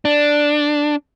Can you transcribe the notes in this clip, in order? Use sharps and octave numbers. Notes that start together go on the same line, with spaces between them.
D4